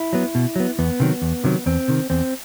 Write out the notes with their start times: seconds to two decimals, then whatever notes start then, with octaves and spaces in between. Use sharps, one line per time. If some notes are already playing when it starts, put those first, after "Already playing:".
Already playing: E4
0.13 F#3 B3
0.35 B2
0.56 F#3 B3
0.79 E2 B3
1.00 C3 D#3 F#3
1.22 E2
1.44 C3 D#3 F#3
1.66 E2 C4
1.88 C3 D#3
2.10 E2 C4